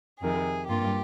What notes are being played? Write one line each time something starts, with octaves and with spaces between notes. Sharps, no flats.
F2 C3 D#3 G#4
G2 G3 A#3 F4 G4